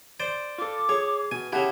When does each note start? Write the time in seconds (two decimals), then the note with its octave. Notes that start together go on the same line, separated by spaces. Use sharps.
0.20 C5 D5
0.58 F4 A4 D6
0.89 G#4 C#5
1.31 B2 G#5
1.53 C#3 E4 G4 E5 F#5 A5